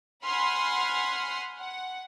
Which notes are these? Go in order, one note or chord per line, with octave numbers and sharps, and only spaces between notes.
F#5 G#5 B5 C6 F6
F#5